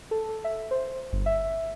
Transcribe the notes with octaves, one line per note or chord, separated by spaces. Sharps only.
A4
E5
C5
G1
E5